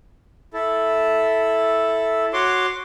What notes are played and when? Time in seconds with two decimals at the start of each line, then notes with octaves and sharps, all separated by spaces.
0.53 E4 A4
2.33 F#4 C#5 C6 D6